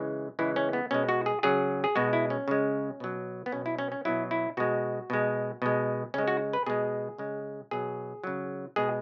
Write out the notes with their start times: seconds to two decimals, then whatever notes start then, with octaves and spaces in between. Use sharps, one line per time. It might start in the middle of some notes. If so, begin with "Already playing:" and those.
Already playing: C#3 E3 G#3
0.39 C#3 E3 G#3 E4
0.56 C#4
0.73 B3
0.91 B2 G#3 C#4
1.09 F#4
1.26 G#4
1.43 C#3 F#3 G#4
1.84 G#4
1.95 B2 G#3 F#4
2.13 E4
2.30 C#4
2.48 C#3 G#3
3.00 B2 F#3
3.46 B3
3.52 B2 F#3 C#4
3.66 E4
3.79 C#4
3.92 C#4
4.05 B2 F#3 E4
4.31 E4
4.57 B2 G#3 F#4
5.10 B2 G#3
5.62 B2 G#3
6.14 C#3 G#3 C#4
6.28 F#4
6.53 B4
6.66 B2 G#3 G#4
7.18 C#3 G#3
7.71 B2 F#3 G#4
8.24 C#3 F#3
8.76 B2 G#3 G#4